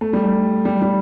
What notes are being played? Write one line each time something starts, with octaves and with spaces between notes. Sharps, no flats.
A3
G3
A3
G3
G3